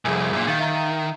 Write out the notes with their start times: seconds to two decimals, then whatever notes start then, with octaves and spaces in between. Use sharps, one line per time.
0.05 C2 F2 G#4 E5 G#5
0.33 F#2 A#2
0.47 D#3 F5 A6
0.59 E5 A#5